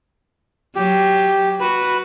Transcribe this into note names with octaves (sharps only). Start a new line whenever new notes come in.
F#3 G4
F#4 B4